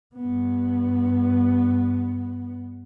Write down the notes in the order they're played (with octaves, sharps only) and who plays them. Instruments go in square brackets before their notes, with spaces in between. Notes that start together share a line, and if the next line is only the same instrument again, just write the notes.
[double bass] G2 B3